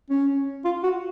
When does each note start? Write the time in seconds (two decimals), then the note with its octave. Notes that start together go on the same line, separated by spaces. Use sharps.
0.10 C#4
0.65 F4
0.83 F#4